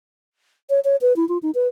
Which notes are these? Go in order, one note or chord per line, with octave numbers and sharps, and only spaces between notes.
C#5
C#5
B4
E4
F4
D#4
B4